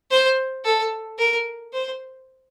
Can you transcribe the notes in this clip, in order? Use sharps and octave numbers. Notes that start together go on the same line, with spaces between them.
C5
A4
A#4
C5